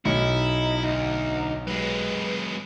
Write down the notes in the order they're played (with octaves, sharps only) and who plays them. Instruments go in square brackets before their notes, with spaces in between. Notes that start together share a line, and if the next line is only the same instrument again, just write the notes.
[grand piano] B1 C#7 [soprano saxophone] D#4 [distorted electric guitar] E4
[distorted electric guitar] D2 [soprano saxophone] D#4
[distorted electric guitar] F#3 G#3 [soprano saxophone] B4